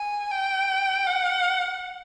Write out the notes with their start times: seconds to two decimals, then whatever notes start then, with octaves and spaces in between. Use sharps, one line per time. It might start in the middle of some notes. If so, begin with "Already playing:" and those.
Already playing: G#5
0.31 G5
1.07 F#5